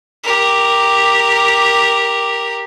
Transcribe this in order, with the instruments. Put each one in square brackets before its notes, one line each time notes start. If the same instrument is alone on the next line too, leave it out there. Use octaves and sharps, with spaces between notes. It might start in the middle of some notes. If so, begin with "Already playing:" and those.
[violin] G4 A#4